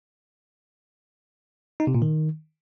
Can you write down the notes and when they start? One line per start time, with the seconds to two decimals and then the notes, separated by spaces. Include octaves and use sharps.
1.80 D#4
1.87 C3
1.95 A#2
2.02 D#3